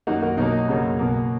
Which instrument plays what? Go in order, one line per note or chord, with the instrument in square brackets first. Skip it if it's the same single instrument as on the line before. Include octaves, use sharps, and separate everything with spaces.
[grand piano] F#2 D#3 A#3 D#4 F#4
F#4 A#4
B2 F#3 A#3 D#4
F#2 C#3 F#3 A#3
B2 A#3